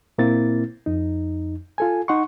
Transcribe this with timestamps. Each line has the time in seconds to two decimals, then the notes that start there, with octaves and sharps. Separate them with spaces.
0.18 A#2 A#3 C4 E4 A6
0.86 F2 D#4
1.78 F4 A4 G#5
2.08 D#4 F#5 C6 C#6